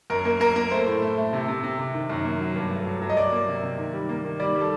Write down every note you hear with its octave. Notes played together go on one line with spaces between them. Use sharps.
F#2 A#4
A#3 A#4
A#3 A#4
A#3 A#4
A3 C5
A2
A3
A3
C3
C3
C3
C3
D#3
F#2
A#3
F#3
G2
A3
F#3
F#3
D#5
F#3 D5
A#3
C3
C3
D#3
G3
A#3
D#3
G3 D5
G3
A4